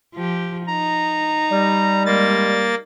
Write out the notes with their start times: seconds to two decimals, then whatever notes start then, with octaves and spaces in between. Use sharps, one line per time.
0.15 F3 G4
0.68 D#4 A#5
1.51 G3
2.06 G#3 A#3 A6